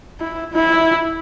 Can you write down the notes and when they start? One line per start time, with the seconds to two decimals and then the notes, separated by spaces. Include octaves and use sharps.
0.20 E4
0.53 E4